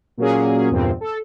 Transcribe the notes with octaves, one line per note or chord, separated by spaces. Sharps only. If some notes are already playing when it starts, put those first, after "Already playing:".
A#2 F#3 A#3 C#4 G#4
E2 G2 A#2 C4
A4